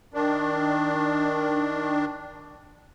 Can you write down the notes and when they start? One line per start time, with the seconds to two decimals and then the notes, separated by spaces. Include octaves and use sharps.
0.14 D#3 D4